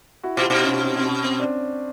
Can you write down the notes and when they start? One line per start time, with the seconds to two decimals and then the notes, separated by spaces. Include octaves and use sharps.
0.23 E4 F#4
0.37 B2 F4 G4
0.50 B2 D#4 F4
0.64 C#4
0.84 C4
0.98 C4
1.04 C#4
1.24 C4
1.40 D4